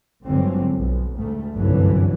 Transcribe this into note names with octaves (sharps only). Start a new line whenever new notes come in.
G1 G#2 D3 F#3 C4
B1
D2 G#2 A3
G1 C2 F#2 D3 E3 F#3